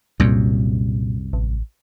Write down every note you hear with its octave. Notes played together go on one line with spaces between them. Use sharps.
C2 F#2 A#2
A1